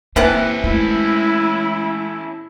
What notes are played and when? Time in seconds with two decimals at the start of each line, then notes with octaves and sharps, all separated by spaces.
0.16 C3 E3 A#3 C#4 A4 F#5
0.64 G#3 A3 E4